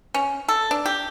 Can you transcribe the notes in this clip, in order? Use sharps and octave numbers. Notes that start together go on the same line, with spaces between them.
C#4
A4
D4
G4